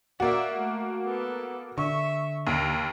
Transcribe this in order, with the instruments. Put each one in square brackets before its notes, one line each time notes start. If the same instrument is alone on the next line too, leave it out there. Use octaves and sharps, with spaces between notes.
[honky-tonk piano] A#3 F#4 [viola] D5 E5
[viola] A3
B3 A4
[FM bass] D3 [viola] E5 [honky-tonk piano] C#6
[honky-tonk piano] D#2 [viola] A#5